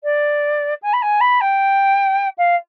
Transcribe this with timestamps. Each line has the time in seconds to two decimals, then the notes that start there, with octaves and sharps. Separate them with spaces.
0.03 D5
0.82 G#5
0.93 B5
1.02 G#5
1.20 B5
1.40 G5
2.38 F5